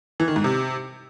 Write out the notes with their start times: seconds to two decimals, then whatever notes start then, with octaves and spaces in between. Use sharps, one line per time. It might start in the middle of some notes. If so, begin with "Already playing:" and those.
0.20 E3
0.28 D#3
0.36 G#2
0.44 C3